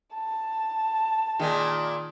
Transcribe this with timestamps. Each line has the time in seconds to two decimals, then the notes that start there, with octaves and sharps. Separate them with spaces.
0.14 A5
1.39 A#2 D#3 G#3